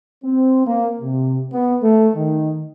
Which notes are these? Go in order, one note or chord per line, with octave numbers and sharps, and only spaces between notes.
C4
A#3
C3
B3
A3
D#3